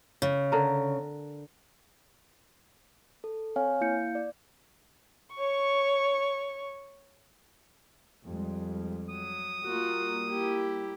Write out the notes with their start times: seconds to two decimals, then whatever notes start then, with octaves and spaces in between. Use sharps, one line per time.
0.22 C#3
0.52 D3 A#4
3.24 A4
3.56 C4 C#5 F5 G#5 F6
3.81 A#3 E4 F5 G6 C#7
4.15 D5
5.36 C#5 C#6
8.25 F2 G3 G#3
9.10 F#3 D#6
9.64 G3 A#3 F4 F#4
10.29 E4 G4